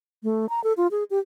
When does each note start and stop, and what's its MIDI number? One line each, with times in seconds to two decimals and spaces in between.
0.23 0.49 57
0.49 0.62 82
0.64 0.73 69
0.77 0.87 65
0.91 1.04 68
1.10 1.19 67